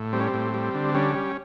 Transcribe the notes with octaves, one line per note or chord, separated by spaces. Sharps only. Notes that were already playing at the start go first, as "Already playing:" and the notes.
Already playing: A2
G3 C4
C#4
C4
A2
G3
D3
G3 C#4
G3